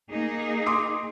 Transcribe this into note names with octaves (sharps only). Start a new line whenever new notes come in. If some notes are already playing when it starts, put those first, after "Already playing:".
A#3 D#4 G#4
C6 D6 D#6